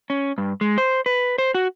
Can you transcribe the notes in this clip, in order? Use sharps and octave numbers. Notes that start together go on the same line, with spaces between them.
C#4
G2
G#3
C5
B4
C5
F#4